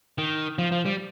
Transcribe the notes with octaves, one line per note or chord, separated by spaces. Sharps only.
D#3
F3
F3
G3